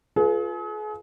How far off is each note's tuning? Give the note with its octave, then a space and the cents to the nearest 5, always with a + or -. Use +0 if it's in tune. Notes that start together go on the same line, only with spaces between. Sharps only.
F4 +0 G#4 +40 B4 -10